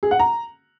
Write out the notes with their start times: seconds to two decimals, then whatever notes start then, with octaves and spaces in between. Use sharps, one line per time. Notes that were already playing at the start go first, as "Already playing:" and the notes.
0.03 G#4
0.11 F#5
0.19 A#5